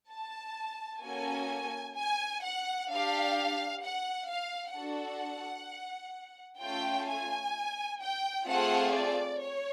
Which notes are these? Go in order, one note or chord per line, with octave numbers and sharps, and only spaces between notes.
A5
A#3 C#4 F#4 A4 G#5
G#5
F#5
D4 G4 F5
F#5
F5
D4 F#4 A4 F#5
A3 C#4 F4 G5
G#5
G5
A3 C4 F4 G#4 F#5
D5
C#5